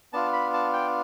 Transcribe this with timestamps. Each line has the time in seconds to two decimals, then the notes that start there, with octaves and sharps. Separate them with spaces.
0.13 B3 D4 F4 A5
0.33 B5
0.53 A5
0.73 G5